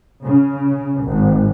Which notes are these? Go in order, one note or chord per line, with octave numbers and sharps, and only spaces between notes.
C#3
G#1